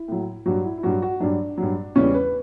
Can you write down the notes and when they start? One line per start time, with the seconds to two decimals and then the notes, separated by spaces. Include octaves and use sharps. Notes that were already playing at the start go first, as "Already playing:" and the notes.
Already playing: E4
0.08 A2 F#3
0.46 G2 F#3 F#4
0.65 E4
0.78 E4
0.83 G2 F#3 F#4
1.02 F#4
1.20 G2 F#3 D4
1.57 G2 F#3
1.95 E2 C#3 E3 G3 C#4
2.14 B4